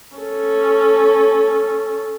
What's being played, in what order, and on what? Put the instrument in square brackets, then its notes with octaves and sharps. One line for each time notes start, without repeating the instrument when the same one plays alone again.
[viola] C#4 A4